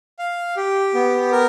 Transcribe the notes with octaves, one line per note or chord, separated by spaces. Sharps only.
F5
G4
B3
A#4